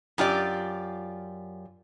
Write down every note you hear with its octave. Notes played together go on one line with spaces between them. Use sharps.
F#2 F4 G4 D5